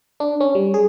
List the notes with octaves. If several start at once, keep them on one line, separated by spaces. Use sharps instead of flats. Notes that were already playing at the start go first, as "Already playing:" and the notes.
D4
C#4
G3
G#4